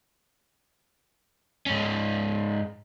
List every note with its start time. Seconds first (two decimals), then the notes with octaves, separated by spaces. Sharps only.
1.66 G#2 C#4